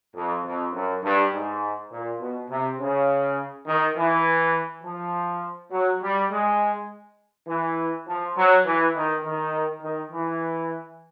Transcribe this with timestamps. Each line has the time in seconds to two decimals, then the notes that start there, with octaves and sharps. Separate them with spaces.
0.14 F2
0.44 F2
0.73 F#2
1.02 G2
1.31 G#2
1.91 A#2
2.20 B2
2.48 C3
2.78 C#3
3.66 D#3
3.95 E3
4.83 F3
5.71 F#3
6.01 G3
6.30 G#3
7.47 E3
8.05 F3
8.35 F#3
8.65 E3
8.94 D#3
9.23 D#3
9.81 D#3
10.10 E3